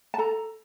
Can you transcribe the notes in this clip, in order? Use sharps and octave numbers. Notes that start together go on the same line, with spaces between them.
A5
A4 A#5